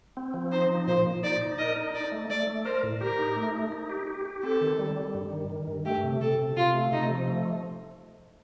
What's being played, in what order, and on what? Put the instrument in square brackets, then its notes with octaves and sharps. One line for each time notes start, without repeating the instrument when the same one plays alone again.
[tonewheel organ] C4
F3
[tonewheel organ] D#4 [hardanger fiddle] C5
[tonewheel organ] F3
[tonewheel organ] A#2 [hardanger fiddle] C5
[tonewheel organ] A#2
[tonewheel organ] D#4 [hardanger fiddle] D5
[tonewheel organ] D#4
[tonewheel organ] A#4 [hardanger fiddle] D#5
[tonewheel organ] D#4
[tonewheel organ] D#4 [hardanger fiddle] D5
[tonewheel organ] A3
[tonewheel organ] A3 [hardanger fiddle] D5
[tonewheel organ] A3
[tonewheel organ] A#4 [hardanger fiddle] C5
[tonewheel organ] A2
[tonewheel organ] G4 [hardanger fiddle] A#4
[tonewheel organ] D#4
A3
D#4
D#4
G4
G4
G4
[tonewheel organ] C4 [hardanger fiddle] A4
[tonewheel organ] D#3
G3
G3
G2
D#3
D#3
G2
[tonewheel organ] A3 [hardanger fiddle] G4
[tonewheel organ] C3
[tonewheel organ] C3 [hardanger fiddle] A4
[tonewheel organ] C3
[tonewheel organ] C3 [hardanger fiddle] F4
[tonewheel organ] A3
[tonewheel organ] C3 [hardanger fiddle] D#4
[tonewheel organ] F3
A3